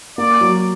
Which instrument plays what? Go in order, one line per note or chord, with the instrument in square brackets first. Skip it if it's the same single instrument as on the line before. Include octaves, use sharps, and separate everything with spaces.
[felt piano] A#3 [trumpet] D5
[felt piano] F#3